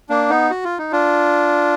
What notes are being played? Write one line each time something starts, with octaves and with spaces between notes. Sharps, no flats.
A#3 D4
B3 D#4
F#4
F4
D#4
D4 F4